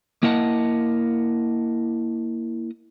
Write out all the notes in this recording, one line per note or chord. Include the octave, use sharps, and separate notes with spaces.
A#3 E4 A#4 D#5 F#5 A5